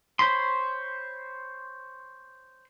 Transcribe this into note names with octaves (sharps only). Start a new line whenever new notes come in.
C5 C#5 B5 C6